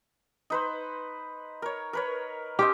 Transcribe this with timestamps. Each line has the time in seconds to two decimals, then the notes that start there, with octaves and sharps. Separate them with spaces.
0.50 D#4 B4 C5
1.62 A#4 C#5
1.93 A#4 B4 C#5
2.59 C#4 G4 C5 D#5